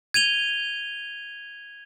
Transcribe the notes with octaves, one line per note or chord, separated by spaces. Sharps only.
G#6 D#7 F7 G7